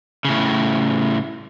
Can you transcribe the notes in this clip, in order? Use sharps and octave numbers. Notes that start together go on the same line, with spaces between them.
A2 C#3